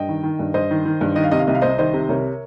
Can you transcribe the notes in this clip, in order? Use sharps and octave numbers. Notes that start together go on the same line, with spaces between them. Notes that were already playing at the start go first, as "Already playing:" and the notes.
Already playing: G2 D#5 G5
D#3
D#3
G2
G2 C5 D#5
D#3
D#3
G2
D#3 D#5
F5
C3 D#5
F5
C2 D#5
F5
C2 C5 D#5
D#3 C5 D#5
C3
C2 A#4 C#5